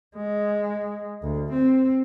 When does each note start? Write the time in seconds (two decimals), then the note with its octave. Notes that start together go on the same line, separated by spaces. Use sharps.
0.16 G#3
1.22 D2
1.51 C4